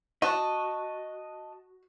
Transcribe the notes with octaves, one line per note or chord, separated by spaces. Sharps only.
F#4 D#5 A5